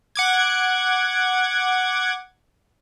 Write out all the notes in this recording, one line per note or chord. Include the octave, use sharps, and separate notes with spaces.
F#5 D6 G#6